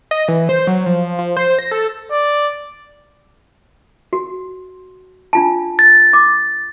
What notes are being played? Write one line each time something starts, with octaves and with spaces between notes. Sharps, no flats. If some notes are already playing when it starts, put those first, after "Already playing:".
D#5
E3
C5
F#3
F3
F3
C5
A#6
A4
D5
F#4
D4 F4 A5
A6
D6